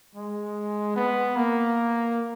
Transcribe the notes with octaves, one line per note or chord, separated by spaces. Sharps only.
G#3
B3
A#3